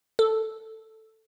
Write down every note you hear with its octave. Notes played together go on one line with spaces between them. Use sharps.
A4